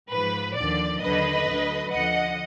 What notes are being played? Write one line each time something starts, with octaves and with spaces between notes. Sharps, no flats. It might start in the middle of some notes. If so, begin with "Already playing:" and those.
G#2 F3 B4
D#2 D3 F3 D5
D#2 D3 F#3 B4 D#5
D2 D3 F#3
D2 D3 F3 D#5 F#5